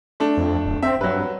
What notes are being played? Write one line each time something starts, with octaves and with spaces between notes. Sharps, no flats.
A3 D4
F2
D1
C4 E5
G2 F#3 B4